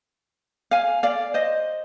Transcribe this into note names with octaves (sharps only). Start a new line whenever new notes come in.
F5 G#5
D5 F5
C5 D#5